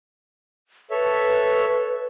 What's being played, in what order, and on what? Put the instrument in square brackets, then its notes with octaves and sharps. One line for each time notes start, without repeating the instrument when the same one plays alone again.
[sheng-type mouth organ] A4 C#5 E5 [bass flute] B4